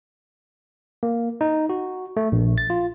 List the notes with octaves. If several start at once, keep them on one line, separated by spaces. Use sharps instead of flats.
A#3
D#4
F#4
A3
A#1
A6
F4